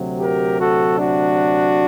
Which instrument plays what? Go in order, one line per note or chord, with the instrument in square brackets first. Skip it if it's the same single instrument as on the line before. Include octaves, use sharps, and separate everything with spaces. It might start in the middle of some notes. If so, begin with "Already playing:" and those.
Already playing: [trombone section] D2 C3 F#3
G4 A#4
F#4 A4
D4 F#4